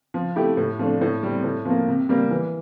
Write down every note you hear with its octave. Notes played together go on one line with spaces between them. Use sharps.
F3
A3 E4 G4
A2
F3 A3 D4
A2
G3 C4
A2
F3 A#3
C3
G3 A#3
E3